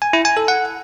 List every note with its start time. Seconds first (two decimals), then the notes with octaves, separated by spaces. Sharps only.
0.02 G#5
0.13 E4
0.25 G#5
0.37 A4
0.48 F#5